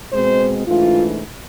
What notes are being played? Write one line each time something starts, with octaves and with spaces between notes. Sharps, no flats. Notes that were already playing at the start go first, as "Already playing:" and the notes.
B2 G#3 C4 C5
G#2 E3 A3 D4 F4